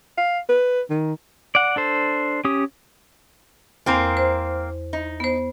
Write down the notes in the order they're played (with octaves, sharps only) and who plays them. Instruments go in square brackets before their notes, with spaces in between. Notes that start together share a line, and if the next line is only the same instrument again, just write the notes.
[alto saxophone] F5
B4
D#3
[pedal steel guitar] D5 F#5
D4 A4 C5
C#4 G4 D#6
[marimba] E2 [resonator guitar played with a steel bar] A#3 C4 A#4
[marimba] C5
[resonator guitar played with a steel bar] D#4
[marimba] B3 C5